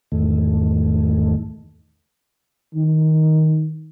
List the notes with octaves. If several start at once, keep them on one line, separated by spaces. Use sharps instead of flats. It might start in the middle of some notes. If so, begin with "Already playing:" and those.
E2 G#2 D#3 A3
D#3